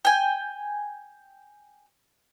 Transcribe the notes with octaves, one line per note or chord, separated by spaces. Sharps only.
G5 G#5